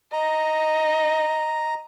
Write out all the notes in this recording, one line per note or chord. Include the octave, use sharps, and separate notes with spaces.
D#5 A#5